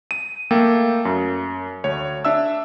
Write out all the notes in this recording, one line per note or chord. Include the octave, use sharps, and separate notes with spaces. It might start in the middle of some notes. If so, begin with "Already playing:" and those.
D#7
A3 A#3 A4 G5
F#2
D2 C#5
D4 E5 E6